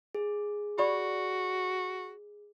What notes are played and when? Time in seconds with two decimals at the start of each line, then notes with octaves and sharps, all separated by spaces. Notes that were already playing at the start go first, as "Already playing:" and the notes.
0.15 G#4
0.79 F#4 G4 D5 B5